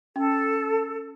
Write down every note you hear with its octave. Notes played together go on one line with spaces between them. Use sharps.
C#4 A4